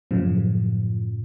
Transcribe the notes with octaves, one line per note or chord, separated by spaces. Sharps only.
F#2 A2 C#3 F3